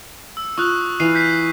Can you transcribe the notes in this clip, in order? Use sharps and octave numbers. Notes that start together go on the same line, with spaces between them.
E6
F4 C#6 D#6 F#6
E3 F5 C7 D#7
G6 B6 C7